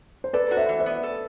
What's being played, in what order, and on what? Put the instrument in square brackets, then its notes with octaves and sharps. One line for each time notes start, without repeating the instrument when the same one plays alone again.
[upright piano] C5
[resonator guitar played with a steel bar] A4 [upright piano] B4 D5
[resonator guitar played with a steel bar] F#4
[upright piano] C5 E5
[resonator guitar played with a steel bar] E3
[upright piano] C5 E5
[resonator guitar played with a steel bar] B3
A4